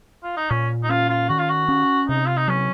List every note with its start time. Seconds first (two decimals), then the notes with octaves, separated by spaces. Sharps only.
0.23 F4
0.37 D#4
0.50 A#2 C#4
0.83 D#4
0.90 C#4 F4
1.09 F4
1.29 D#3 F#4
1.39 F4
1.49 F#4
1.68 C#4
2.09 C3 D#4
2.26 F4
2.37 D#4
2.48 F#3 C#4